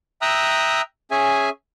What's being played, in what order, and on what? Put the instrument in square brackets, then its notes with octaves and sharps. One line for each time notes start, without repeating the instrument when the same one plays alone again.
[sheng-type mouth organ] E5 G5 A#5 D#6 E6 F#6
C#4 G#4 E5 G#5